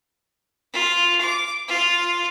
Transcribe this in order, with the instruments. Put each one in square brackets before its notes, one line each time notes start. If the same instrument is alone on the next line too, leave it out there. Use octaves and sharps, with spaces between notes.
[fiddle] F4
D6
F4